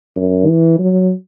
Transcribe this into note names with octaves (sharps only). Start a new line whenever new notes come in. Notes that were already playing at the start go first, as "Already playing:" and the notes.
F#2
E3
F#3